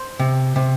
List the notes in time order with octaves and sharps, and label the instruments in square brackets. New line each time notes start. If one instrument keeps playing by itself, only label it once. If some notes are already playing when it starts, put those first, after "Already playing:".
Already playing: [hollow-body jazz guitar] C5
C3
C3